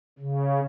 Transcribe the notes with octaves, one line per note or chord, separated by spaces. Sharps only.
C#3